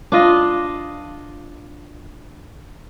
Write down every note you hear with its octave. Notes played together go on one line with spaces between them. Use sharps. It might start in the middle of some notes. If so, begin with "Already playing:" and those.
D4 F4 D#5